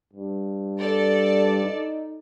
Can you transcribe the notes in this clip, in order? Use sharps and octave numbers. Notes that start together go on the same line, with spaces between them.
G2
A4 D5
D#4